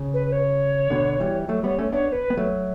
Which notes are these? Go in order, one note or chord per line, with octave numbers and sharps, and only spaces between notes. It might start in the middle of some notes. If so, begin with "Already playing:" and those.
Already playing: C#3
B4
C#5
B2 D3
E3 G3
F#3 A3
G3 B3 C#5
A3 C#4
B3 D4 C#5
C#5
B4
B3
F#3 A3